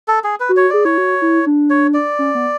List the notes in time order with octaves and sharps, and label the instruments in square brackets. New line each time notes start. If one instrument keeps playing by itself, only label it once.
[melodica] A4
G#4
B4
[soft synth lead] F#4
[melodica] C#5
[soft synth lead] G#4 [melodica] D5
[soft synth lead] E4 [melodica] C#5
[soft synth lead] F#4
E4
D4
[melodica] C#5
D5
[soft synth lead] C#4
B3